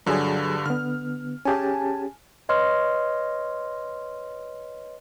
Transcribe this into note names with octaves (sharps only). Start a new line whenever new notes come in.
G2 D3 F#3 G#4
D3 B3 F6
C#4 G4 G#4 G#5 A5
B4 C#5 D#5 C6 F6